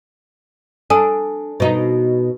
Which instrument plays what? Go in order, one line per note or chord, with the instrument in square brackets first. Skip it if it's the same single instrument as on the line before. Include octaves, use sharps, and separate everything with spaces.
[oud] D4 [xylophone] A4 G#5 D#6
[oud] B2 D#4